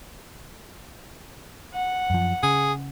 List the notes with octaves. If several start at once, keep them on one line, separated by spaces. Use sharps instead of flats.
F#5
F#2 F3
C#3 G#4